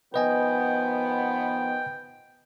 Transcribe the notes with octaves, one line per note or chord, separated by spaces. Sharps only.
D#3 F3 B3 B4 D#5 G5 G#5